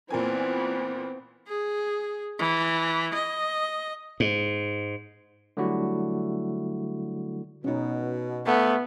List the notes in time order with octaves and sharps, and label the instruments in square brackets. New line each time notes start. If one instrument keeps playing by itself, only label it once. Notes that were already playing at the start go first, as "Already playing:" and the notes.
[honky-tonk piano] A#2 A#4 G#5 [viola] E3 B3 [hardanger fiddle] C4
[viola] G#4
E3
D#5
[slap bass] G#2
[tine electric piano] D3 F#3 G3 A3 E4 F#4
[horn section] B2 [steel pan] C#4 D#4
[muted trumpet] A3 [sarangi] B3